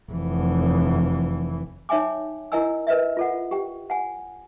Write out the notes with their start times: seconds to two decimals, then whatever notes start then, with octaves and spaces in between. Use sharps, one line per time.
0.12 F1 E3
1.89 D#4 C#5 E5 G5 G#5 D6
2.52 E4 A#4 D#5 G#5 E6
2.87 A#4 B4 D#5 E5
3.17 F4 A4 F#5
3.51 G4 G5
3.90 F#5 G#5